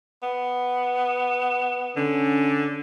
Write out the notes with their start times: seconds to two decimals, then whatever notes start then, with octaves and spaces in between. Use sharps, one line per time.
0.23 B3
1.96 D3 C#4